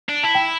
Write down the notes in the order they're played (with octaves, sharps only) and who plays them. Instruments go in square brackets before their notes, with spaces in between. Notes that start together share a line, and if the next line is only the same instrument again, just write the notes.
[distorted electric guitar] D4
[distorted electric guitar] E4 [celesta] A5
[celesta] G5